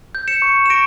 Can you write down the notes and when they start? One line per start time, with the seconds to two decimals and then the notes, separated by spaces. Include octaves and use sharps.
0.15 G6
0.28 C#7 E7
0.42 C#6
0.66 E7
0.70 C#6 A#6 D7